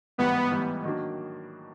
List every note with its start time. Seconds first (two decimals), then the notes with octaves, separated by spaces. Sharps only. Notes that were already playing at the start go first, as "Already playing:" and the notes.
0.18 A1 G#2 E3 G3 B3
0.51 A1 G#2 E3 G3
0.84 D#3 F#3 A#3 D4 F#4